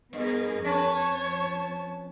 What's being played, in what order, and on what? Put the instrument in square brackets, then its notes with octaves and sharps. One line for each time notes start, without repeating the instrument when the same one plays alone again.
[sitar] G2 [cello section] B3 G#4 A#4
[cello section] F2 [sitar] C#4 B4 [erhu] C#5 [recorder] A5